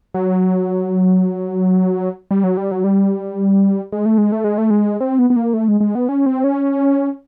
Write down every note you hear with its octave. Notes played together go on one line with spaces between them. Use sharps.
F#3
G3
F#3
G3
F#3
G3
G#3
A3
G#3
A3
G#3
A3
G#3
C4
B3
B3
A#3
A3
G#3
G#3
B3
C#4
C4
C#4